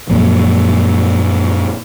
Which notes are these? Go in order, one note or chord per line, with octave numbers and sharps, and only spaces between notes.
F#2 A#2 F3